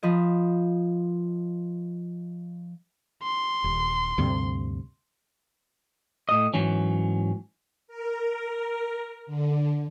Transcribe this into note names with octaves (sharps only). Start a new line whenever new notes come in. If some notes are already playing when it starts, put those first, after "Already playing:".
F3 B4 D#5
C6
D#1
D2 G2 C3
A2 D#5
G#2 E3 F#3 C#4
A#4
D3